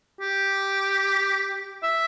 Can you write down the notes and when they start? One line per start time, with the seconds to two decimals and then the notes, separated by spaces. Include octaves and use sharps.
0.21 G4
1.83 E5